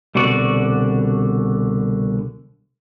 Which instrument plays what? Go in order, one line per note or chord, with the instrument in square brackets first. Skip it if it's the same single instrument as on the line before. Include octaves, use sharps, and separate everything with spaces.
[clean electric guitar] C2 B2 D3 F#4 D5